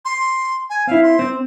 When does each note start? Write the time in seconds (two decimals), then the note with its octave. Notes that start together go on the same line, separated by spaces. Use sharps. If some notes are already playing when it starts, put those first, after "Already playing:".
0.05 C6
0.70 G#5
0.87 C4 E4 F5
1.03 C6
1.19 C4